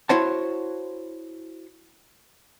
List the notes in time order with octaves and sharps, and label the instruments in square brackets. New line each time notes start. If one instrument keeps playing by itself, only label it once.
[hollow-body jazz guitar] E4 F#4 C5 C#5 F#5 A5